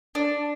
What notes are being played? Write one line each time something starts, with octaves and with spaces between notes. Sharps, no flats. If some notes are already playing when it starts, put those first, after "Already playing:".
D4